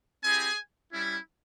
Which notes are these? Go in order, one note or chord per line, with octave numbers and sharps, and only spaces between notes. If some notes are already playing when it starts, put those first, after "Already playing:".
C4 E4 G4 G#4 G#5
G3 C#4 E4